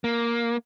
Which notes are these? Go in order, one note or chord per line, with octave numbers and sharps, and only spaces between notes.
A#3